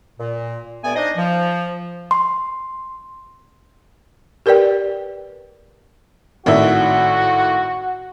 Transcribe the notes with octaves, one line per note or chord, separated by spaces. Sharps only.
A#2
G2 A3 B3 D5 G#5
D4 D#4 C5 D#5
F3
C6
G4 A#4 B4 D5 G5
G#1 A2 F#4 E5